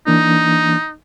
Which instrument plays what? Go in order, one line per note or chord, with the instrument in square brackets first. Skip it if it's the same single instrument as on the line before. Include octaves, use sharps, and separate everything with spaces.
[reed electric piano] E3 A#3 D4 [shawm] D#4